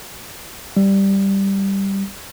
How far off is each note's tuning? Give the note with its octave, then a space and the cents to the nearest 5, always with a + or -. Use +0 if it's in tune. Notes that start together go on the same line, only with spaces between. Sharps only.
G3 +0